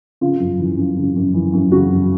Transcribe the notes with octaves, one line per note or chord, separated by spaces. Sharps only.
C#3 F4
F#2
E3
F#2
C#3
F#2
E3
F#2
C#3 F#4
F#2